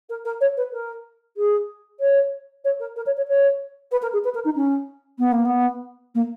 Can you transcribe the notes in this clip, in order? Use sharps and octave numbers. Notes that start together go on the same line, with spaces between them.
A#4
A#4
C#5
B4
A#4
G#4
C#5
C#5
A#4
A#4
C#5
C#5
C#5
B4
A#4
G#4
B4
A#4
D#4
C#4
B3
A#3
B3
A#3